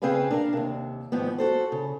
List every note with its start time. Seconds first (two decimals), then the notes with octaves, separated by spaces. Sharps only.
0.02 C#3 C4 G#4 B4 F5 G#5
0.30 D4 A#4 F5
0.53 D#2 C3
1.12 G#2 D#3 F3 B3
1.38 F#4 A4 C5
1.72 C#3